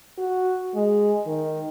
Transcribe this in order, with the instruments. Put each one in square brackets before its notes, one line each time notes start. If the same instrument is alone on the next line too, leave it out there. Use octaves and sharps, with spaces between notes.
[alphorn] F#4
G#3
D#3